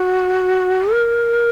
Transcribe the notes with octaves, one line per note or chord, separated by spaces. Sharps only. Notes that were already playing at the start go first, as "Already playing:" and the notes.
Already playing: F#4
A#4